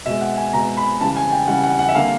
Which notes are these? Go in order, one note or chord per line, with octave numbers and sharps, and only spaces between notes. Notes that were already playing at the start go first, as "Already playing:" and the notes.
B2 G#3 E5
F#5
G#5
B2 G#3 A#5
B5
C#3 E3 G3 A5
G#5
G5
C#3 E3 G3 F#5
F#5
F#5
E5
D3 G3 A#3 F5